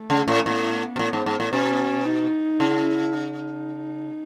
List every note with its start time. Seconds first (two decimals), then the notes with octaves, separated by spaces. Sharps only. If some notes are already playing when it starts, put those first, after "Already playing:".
Already playing: A3
0.10 C#3
0.28 A2
0.46 A2 B3
0.96 B2
0.99 A2
1.13 G#2
1.26 G#2
1.40 A2
1.53 B2 C#4
2.06 D#4
2.60 C#3 E4
3.13 D#4